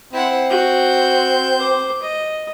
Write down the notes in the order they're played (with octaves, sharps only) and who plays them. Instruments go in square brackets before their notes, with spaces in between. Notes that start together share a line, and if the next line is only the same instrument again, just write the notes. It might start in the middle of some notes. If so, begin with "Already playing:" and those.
[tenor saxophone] C4 [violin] E4 F#5
[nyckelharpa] F#4 [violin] G6
[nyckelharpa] C5 D6
D#5